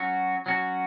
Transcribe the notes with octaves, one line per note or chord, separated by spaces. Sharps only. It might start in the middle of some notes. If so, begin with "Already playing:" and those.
Already playing: F#3 C#4 F#4
F#3 C#4 F#4